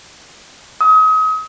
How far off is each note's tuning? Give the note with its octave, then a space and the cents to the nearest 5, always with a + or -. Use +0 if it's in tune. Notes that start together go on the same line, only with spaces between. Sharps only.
D#6 +35